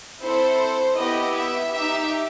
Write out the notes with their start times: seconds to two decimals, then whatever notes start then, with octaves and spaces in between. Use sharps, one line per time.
0.22 C4 E4 A4 C5
0.97 B3 E4 G4 D#5
1.36 E5
1.73 D#4 G4 E5